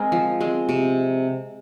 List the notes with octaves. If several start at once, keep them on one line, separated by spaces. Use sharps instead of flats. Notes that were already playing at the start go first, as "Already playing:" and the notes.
Already playing: G#3 C4 G#4 A#4
F3
G#3 C4
C3